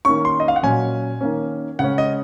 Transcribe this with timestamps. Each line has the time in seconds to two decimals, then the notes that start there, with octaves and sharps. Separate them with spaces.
0.05 D#3 A#3 C#4 C#6
0.25 C6
0.40 D#5
0.48 F5
0.56 F#5
0.63 A#2 F#3 C#4 G#5
1.21 D#3 A#3 C#4
1.79 C#3 G#3 C#4 F#5
1.98 D#5